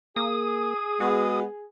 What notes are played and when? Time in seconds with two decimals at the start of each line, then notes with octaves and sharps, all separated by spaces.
0.16 A#3 G#4 D#6
1.00 G#3 B3 F#4